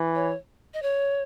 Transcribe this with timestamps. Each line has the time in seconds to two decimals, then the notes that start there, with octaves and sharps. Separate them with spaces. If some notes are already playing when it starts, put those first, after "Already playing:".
Already playing: E3
0.15 C#5
0.74 D#5
0.82 C#5